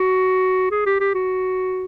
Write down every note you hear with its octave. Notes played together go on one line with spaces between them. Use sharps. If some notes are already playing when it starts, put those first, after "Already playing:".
Already playing: F#4
G#4
G4
G4
F#4